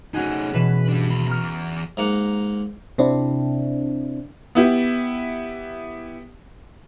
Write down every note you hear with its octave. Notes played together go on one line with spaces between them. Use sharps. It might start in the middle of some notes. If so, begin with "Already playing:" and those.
A3 C#4 D#4 F#4 G#4
B2 E3 B4 E7
G3 D4
D#2 B5
E2 A#5 C#6 F6
G#2 A#3 F#5
C3 C4 D4 E4
B3 E4 G4